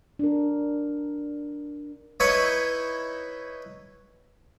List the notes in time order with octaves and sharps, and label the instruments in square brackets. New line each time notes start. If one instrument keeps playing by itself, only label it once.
[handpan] D4 A#4
[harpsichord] D#4 E4 B4 C#5 D#5